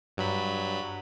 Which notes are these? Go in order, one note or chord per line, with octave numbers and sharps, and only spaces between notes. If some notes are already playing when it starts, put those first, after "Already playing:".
G2 F#3 B5